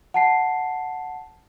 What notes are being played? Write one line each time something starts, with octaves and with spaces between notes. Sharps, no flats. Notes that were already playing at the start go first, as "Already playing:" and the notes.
F#5 A5 C7